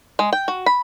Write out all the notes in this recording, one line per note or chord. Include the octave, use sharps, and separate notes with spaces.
G#3
G5
F#4
B5